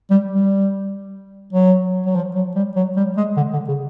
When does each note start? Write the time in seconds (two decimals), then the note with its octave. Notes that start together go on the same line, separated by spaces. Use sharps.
0.10 G3
0.31 G3
1.53 F#3
2.06 F#3
2.15 F3
2.35 F#3
2.55 G3
2.76 F#3
2.97 G3
3.17 G#3
3.36 D3
3.53 D3
3.68 C#3